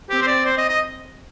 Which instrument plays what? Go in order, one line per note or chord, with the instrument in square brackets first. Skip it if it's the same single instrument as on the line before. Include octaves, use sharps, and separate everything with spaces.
[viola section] C4 [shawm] G4
[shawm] C5
D5
C5
D#5
D#5